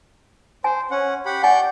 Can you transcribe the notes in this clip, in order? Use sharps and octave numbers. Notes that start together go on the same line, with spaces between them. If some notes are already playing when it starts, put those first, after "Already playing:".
C5 G#5
C#4 F#5
G4 F#5 B5
D5 F#5 G#5 C#6 G6